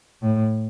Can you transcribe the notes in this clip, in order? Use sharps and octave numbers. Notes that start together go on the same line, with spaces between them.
A2